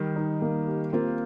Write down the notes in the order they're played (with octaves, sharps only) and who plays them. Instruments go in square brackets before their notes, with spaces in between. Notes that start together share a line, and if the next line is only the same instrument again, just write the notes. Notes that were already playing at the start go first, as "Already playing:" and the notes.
Already playing: [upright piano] D#3 G3
[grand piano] D#4
A#3
G4
[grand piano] A#3 [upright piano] C4 F4